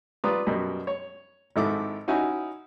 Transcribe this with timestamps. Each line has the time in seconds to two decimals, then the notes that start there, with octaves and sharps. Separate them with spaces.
0.24 G3 F4 B4 D5 A#5 D#6
0.47 F#2 B2 G3
0.87 C#5
1.56 G#1 G#2 E4 A4 D6
2.08 C#4 D#4 E4 F#4 G#5